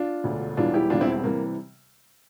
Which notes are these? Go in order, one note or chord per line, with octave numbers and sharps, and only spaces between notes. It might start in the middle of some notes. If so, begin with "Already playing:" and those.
Already playing: D4 F4
E1 D2 D3
E1 E2 E3 G3 D4 F4
E4 G4
E1 E2 E3 G3 D4 F4
C4 E4
C4
C3 E3 G3 A#3